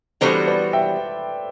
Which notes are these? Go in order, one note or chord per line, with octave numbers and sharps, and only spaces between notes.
E3 G3 B3 D4 F#4 A4 C5
B4 D5
E5 G5